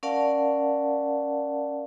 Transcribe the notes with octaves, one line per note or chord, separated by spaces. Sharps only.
C#4 A#4 D5 F5 F#5 A5